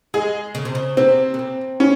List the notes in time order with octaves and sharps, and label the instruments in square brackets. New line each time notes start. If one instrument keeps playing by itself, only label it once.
[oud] G#3 [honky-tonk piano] G#4
[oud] C#3
C3
C#3
[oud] C3 [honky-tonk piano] C4
[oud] C#3
C3
[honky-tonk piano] C#4